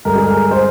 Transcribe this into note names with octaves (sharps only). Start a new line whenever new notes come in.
G2 D3 G#3 A#4
G#4
A#4
C5